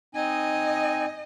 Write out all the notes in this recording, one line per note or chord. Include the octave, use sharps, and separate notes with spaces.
C4 D#4 D#5 G#5